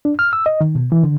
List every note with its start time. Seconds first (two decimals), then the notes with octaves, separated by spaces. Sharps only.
0.05 D4
0.19 F6
0.33 E6
0.46 D#5
0.61 D#3
0.75 B2
0.92 E3
1.03 D3